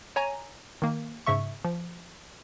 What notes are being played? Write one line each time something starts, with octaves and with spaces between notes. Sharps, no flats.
C#5 G#5 A#5 D#7
D#3 A#3
G#2 C#3 E5 C#6
F3